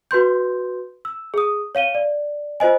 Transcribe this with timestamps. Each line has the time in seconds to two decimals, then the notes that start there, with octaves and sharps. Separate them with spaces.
0.11 F#4 B4 C6 G6
1.05 E6
1.34 G#4 D#6
1.75 C#5 F5 D#7 G7
1.95 D5
2.60 F4 C5 D#5 G#5